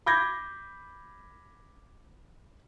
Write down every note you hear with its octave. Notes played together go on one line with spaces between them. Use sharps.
B5 D6 G6 G#6 A#6